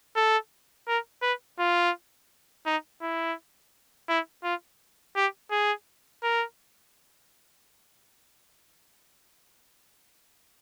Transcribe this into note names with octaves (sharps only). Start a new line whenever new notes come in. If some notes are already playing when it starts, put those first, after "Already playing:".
A4
A#4
B4
F4
D#4
E4
E4
F4
G4
G#4
A#4